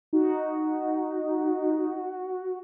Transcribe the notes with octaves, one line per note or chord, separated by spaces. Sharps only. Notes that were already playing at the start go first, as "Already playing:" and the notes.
D#4 F#4